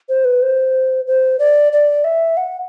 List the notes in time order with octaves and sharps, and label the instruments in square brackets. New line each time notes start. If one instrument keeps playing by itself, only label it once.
[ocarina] C5
B4
C5
C5
D5
D5
E5
F#5